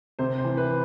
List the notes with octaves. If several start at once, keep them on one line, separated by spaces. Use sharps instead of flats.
C3 C5
C5
E3
B4